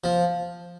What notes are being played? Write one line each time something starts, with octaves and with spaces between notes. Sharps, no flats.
F3